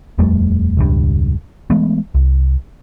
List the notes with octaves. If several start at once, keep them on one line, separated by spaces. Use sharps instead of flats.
D#1 F2 G3 A3
E1 C#2 G2
E3 G#3 A3 B3
C2